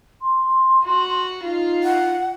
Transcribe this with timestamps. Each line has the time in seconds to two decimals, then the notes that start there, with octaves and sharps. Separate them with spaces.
0.21 C6
0.85 F#4
1.44 D#4 F4
1.83 F#5